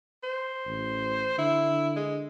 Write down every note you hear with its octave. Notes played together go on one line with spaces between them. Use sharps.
C5
A1
D3 E4
G#3